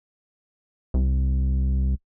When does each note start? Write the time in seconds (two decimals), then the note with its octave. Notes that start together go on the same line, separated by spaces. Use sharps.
0.94 C2